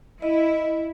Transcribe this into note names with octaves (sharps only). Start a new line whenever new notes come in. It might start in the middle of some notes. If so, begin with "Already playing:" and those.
E4 D#5